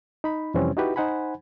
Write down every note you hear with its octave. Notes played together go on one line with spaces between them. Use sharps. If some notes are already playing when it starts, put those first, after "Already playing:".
D#4 B5
F2 C3 E3 G3 C4 C#4
D#4 E4 F#4 G4 B4
D#4 C5 F#5 G#5 B5